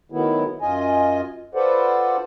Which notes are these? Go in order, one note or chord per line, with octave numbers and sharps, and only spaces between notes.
D#3 F#3 A3 B3 E4
F#2 F4 D#5 G#5
F4 A4 B4 C5 D5 F#5